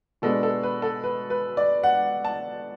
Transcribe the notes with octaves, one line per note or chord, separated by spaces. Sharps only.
B2 G#3 B3 D4 A4
A4
B4
A4
B4
B4
D5
F#5
A5